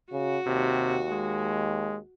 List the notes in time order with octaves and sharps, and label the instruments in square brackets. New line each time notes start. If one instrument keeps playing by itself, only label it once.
[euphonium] C#3 [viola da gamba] F#4
[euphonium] D#2 [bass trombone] C3
[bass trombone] G#3